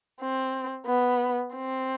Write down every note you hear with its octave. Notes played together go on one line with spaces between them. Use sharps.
C4
B3
C4